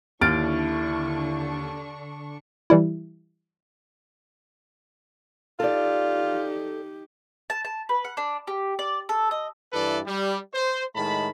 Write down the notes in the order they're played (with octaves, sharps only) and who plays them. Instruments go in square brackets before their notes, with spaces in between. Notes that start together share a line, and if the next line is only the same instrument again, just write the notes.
[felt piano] D#2 [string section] D3 D4 C#6 [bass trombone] E4 [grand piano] F6 A6 D7
[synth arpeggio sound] E3 G3 E4
[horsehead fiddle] D#4 G4 [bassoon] F4 [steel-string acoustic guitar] A4 D5
[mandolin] A5
A5
B4
F#5
D4
G4
D5
A4
D#5
[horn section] G2 E3 E4 A4 B4 D5
G3
C5
A2 D#3 G#3 A5 B5